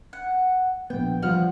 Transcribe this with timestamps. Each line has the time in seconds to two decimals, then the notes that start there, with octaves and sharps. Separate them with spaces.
0.13 F#5
0.90 A#1 B3 G5
1.22 F3 G3 F#5 F6